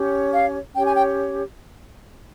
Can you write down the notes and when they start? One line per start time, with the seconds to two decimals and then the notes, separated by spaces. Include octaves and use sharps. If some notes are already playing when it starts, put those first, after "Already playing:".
Already playing: C#4 G4 C#5
0.33 F5
0.75 C#4 G4 C#5 G5
0.86 G#5
0.95 G5